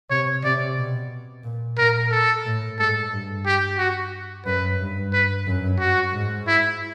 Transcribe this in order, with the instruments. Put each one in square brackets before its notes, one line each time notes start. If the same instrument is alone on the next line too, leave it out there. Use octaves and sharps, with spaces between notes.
[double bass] C3 [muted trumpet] C#5
[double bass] C3 [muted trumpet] D5
[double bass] B2
A#2
[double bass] A#2 [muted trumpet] A#4
[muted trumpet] A4
[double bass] A2
[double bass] G#2 [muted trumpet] A4
[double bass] G2
[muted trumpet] G4
F#4
[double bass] F#2 [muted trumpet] B4
[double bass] G2
[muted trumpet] B4
[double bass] F#2
[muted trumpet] F#4
[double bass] G#2
[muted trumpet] E4